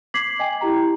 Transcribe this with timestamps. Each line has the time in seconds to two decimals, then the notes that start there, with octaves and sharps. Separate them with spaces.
0.14 D6 G#6 B6 C7 F#7
0.39 D#5 G5 G#5
0.61 E4 G4 A#5